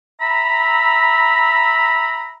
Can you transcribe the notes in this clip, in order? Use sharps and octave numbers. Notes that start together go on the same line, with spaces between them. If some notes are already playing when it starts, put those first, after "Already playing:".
E5 A#5 B5